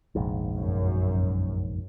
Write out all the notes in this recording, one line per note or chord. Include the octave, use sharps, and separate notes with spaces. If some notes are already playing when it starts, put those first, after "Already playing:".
F1 A#1 G#2
F#2